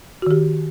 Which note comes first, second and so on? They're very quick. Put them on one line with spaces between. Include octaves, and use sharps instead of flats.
F#4 D#3 G4